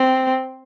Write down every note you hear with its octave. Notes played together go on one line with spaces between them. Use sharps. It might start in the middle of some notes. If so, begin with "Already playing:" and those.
Already playing: C4